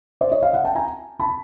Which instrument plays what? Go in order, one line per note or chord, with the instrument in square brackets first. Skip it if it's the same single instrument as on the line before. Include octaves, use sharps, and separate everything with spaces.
[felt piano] C5 D5
C#5 D#5
D#5 F5
E5 F#5
G5 A5
G#5 A#5
A5 B5